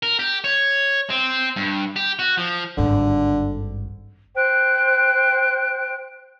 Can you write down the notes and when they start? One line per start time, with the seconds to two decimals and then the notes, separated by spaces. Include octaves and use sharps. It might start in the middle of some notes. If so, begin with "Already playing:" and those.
0.03 A#4
0.19 G4
0.44 C#5
1.10 C4
1.56 G2
1.96 G4
2.19 F#4
2.38 F3
2.77 G#1 G2 D3
4.36 C5 G5 F#6